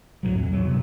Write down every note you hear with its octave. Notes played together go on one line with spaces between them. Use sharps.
D2 A2 F3 F#3
F2
E2 G#2 F#3 B3
G2 C3